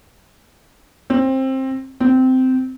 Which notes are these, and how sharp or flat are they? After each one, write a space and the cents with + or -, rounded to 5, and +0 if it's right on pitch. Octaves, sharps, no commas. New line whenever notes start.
C4 +20
C4 -15